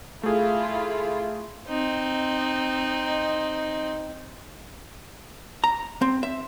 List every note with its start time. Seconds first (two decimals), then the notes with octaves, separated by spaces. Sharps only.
0.23 A3 E4 F4 G#4
1.68 C4 D#4
5.64 A#5
6.02 C4
6.23 E5